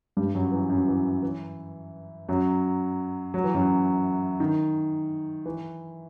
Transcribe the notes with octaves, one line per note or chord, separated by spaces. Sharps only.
G2 G3
F#2 F#3
E3
F#2 F#3
E3
E3
F#2 F#3
F#3
E3
F#2 F#3
D#3
E3